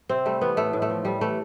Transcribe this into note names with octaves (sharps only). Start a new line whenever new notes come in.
C3 C4
G3 A3
E3 B3
A2 A3
A2
A3
F3
A2 G3
E3 A3